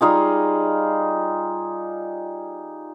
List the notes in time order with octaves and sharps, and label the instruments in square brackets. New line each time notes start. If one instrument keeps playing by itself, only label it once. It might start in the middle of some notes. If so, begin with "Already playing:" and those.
[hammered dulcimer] G3 D#4 F4 G#4